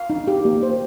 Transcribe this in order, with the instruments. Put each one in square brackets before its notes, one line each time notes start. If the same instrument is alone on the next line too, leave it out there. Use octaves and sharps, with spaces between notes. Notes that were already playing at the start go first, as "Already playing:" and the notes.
Already playing: [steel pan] F5
D#4
G4
A#3
C5